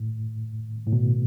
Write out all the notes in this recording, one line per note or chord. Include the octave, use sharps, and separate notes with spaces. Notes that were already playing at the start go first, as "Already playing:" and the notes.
Already playing: A2
A2
B2